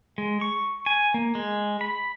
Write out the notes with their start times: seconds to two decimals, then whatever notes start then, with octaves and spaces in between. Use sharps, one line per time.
0.18 G#3
0.41 C#6
0.86 G#5
1.14 A#3
1.35 G#3
1.81 B5